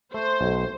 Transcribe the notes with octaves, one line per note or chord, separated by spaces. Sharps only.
A3 C5
B1